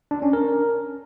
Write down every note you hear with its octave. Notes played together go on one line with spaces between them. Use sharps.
D4
C#4
A#4